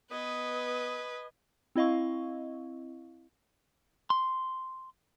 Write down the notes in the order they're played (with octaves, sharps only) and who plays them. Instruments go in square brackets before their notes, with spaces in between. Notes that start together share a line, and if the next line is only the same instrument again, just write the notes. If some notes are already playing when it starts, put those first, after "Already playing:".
[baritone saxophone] B3 [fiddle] B4 [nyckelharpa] D#5 G#5 [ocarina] D#6
[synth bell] C4 E4 D#5 F5 C#6
[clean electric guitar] C6